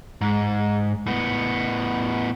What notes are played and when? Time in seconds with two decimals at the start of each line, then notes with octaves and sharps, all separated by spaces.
0.21 G#2
1.06 A2 B3